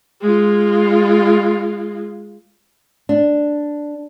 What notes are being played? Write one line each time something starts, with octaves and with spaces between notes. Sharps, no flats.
G#3 F4
D4